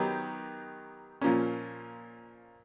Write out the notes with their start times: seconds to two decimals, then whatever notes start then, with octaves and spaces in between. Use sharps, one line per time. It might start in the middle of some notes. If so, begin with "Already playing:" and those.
Already playing: D#3 F#3 B3 D#4 G4
1.21 A#2 F3 A#3 C#4